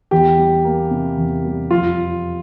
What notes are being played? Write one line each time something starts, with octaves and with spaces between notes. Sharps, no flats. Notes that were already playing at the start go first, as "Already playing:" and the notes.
E2 G4
G3
A#3
C3
E2
G3
F2 F4